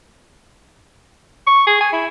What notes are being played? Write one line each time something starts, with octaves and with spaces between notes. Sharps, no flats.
C#6
G#4
G#5
E4